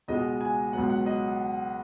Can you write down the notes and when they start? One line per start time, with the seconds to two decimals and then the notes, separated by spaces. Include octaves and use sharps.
0.08 C#2 B2 G#3 D#5
0.41 G#5
0.73 C#2 B2 F#3 B3 F#5
0.90 F#5
1.06 D#5